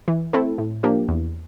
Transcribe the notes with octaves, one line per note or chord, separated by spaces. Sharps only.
E3
A3 C4 E4 A4
A2
F3 A#3 D4 G4
E2